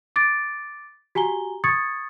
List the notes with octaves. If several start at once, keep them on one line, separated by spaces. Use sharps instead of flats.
D6 A6 D7
F#4 G4 G#5 A#5 G7
C#6 D#6 G#6 A6 C#7